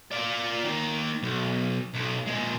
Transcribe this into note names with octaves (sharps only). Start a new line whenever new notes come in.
F4 D5
D#3 A#3
B1
B1
A#2 G#3